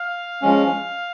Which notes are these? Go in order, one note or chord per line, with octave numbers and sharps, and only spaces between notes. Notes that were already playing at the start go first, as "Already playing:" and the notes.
Already playing: F5
F3 G#3 C#4